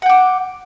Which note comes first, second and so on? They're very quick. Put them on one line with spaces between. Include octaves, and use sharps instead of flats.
F#5 G5 D6